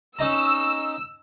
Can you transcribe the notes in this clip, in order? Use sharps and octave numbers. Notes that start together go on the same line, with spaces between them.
C#4 D#4 A#5 E6